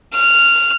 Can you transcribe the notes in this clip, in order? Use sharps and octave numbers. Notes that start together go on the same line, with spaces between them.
F6